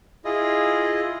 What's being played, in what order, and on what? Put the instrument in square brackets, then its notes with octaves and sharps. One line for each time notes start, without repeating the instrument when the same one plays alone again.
[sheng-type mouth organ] E4 F4 G#4 D#5